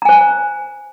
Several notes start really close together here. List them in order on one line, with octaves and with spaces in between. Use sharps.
A#5 G#5 C5